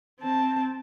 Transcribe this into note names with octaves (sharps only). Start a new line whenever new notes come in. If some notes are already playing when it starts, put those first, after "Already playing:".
C4 A5